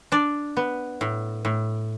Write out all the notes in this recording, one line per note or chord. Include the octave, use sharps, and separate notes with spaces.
D4 D5
B3
A2
A2